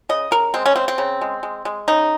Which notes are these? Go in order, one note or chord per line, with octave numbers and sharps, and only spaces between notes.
C#3 D#5
C#3 A#4
G#3 C4
C#4
C#3 C4
C4
C#3
G#3
G#3
G#3
C#3 D#4